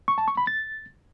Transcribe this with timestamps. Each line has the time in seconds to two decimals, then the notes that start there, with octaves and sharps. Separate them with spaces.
0.08 C#6
0.18 A5
0.28 C#6
0.37 B5
0.47 A6